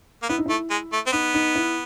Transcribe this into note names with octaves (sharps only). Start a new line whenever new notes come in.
A#3
B3 E4
D#4
A3 E4
G#3
A3
C4
B3 D#4
D#4
E4